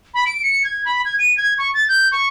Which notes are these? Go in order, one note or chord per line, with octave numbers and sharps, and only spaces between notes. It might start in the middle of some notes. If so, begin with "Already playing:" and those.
B5
D7
C#7
G#6
B5
G#6
D#7
G#6
C#6
A6
G6
C#6